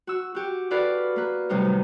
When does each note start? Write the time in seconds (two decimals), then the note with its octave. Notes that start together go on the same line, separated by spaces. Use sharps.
0.07 F#4 E6
0.35 F#4 G4
0.71 E4 F#4 A4 B4 D5 F5
1.16 A#3 B4
1.49 A2 C3 F#3 G3 D#4 F#4
1.65 D#3